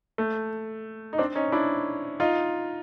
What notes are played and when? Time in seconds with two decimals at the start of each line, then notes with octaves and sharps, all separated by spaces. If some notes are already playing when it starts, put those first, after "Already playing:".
0.18 A3
1.13 D#4
1.18 C4 D4
1.35 C#4 D#4
1.52 D4 E4
2.20 D#4 F4